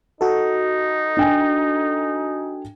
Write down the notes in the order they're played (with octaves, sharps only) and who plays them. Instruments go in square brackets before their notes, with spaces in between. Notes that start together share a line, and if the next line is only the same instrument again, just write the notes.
[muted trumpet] D#4 [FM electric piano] F#4 A4
[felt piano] D4 G5 G#5